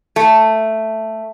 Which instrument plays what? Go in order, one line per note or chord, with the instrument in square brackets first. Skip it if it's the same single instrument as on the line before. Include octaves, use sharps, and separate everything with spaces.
[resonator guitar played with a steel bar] A3